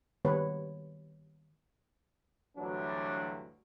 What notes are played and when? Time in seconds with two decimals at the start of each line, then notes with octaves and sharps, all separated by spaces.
0.25 D#3 G3 B3 B4 C#5
2.57 D2 G2 E3 F#3 D4